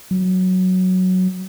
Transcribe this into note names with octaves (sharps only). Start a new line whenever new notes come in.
F#3